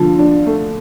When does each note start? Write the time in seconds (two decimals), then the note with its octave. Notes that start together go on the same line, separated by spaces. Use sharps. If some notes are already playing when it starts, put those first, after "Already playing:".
Already playing: D3 F3
0.19 D4
0.46 A3